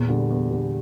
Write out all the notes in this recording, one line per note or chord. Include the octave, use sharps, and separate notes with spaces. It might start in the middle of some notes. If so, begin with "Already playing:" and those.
Already playing: E2 A#2
D3 G3
E2
D3 G3